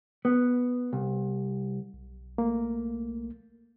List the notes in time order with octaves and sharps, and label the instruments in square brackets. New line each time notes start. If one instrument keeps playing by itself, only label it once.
[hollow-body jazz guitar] B3
C2
[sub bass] B1
[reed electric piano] A3 A#3